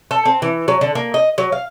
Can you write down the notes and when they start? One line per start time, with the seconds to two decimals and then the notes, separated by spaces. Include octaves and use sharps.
0.11 A4
0.25 C4
0.42 E3
0.68 F#3
0.81 D3
0.95 A#3
1.14 D#5
1.38 F#3
1.52 F5